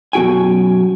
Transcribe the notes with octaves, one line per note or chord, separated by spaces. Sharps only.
F#2 B2 F#4 G5 G#5